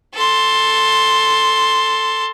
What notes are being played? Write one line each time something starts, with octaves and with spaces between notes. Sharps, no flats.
A4 C6